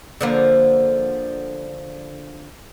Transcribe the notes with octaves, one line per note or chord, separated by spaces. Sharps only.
D3 F3 A#3